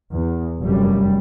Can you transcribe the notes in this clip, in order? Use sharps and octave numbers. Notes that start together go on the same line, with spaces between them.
E2
F1 F#2 G3